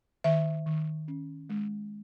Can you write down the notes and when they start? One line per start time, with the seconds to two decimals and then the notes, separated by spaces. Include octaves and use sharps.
0.24 D#3 E5
0.66 D#3
1.08 C#4
1.49 G#3